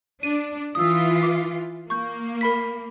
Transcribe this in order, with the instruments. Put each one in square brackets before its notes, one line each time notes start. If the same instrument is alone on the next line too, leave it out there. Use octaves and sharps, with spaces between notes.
[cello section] D4 [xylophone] D#7
[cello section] E3 F4 [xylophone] D#6 E6
[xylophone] D6
[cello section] A#3 [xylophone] C#6 G6
[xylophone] A#4 B5 B6